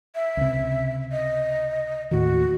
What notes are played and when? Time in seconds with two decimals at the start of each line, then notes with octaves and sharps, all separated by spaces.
0.15 E5
0.37 C#2 C3
1.12 D#5
2.11 D#2 A2 D#3 F#4